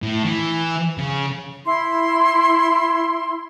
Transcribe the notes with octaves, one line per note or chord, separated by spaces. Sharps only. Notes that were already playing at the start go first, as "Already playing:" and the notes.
A2
E3
C#3
E4 C6